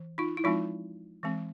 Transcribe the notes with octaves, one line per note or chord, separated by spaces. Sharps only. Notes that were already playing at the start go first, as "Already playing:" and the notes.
Already playing: E3
D#4 F4
E4
F3 G#3 C4 D#4 F4
E3 G#3 C4